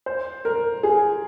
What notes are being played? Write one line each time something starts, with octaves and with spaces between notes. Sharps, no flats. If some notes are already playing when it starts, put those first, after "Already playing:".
C5
A#4
G#4